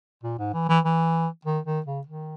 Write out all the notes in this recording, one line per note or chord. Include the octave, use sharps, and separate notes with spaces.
A#2
G#2
E3
E3
E3
D#3
D#3
C#3
D#3